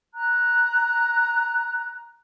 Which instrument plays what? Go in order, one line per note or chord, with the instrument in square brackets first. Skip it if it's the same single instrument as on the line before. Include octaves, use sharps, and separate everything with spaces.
[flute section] A#5 F#6